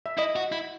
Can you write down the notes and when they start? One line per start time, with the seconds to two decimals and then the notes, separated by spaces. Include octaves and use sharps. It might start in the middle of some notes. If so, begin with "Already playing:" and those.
0.06 E5
0.18 E4 D#5
0.36 F#4
0.52 E4